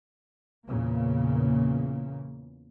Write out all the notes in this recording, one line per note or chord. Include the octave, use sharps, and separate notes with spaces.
E2 A#2 C#3 A#3